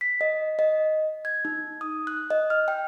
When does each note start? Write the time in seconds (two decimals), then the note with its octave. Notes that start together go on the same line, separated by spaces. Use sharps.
0.01 B6
0.21 D#5
0.59 D#5
1.25 G#6
1.45 D#4
1.81 D#6
2.07 F#6
2.30 D#5
2.50 F6
2.68 G5